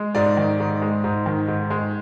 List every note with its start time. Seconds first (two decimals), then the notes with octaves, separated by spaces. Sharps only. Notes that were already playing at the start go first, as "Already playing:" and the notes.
Already playing: G#3
0.15 G#2 D5
0.37 D#3
0.60 G#2
0.82 G#3
1.04 G#2
1.26 D#3
1.48 G#2
1.70 G#3